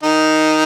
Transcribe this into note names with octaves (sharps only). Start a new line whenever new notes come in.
D#3 D#4